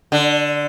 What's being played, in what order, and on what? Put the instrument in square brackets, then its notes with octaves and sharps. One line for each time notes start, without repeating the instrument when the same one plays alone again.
[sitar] D3